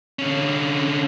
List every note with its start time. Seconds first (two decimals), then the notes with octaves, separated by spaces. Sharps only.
0.19 D3 C#4